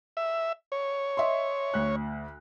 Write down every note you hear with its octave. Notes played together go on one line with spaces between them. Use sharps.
E5
C#5
D#5 E5 C6
D2 F#6